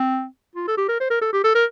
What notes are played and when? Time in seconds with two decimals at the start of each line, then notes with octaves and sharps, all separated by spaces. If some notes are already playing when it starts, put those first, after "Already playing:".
Already playing: C4
0.55 F4
0.68 A4
0.77 G4
0.89 A#4
1.00 C5
1.10 A#4
1.21 A4
1.33 G4
1.44 A4
1.55 A#4